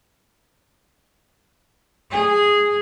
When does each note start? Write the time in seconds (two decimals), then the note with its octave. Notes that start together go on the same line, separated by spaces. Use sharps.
2.11 G#4